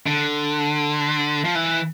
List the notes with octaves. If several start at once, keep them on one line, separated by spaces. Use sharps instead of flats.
D3
F3
E3